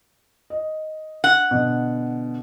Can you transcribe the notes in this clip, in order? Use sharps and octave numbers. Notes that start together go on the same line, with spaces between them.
D#5
F#5
B2 D3